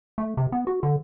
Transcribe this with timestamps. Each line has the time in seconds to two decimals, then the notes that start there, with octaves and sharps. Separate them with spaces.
0.18 A3
0.37 C3
0.52 B3
0.67 F#4
0.83 D3